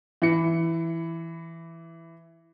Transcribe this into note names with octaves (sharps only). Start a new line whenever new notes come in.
E3 E4 C#7